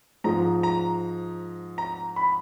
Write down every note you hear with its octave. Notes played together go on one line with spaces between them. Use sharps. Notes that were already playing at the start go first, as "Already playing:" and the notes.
G#2 F3 G#3 A#5
A#5
A#5
B5